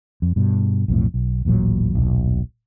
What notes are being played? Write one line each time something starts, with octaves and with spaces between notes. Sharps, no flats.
F2
G2 B2
B1 F2 A2
B1
D#1 A1 A#2 F#3
D#1 B1